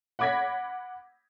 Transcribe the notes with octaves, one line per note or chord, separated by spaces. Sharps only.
F#5 B5 D6 G#6 A#6 B6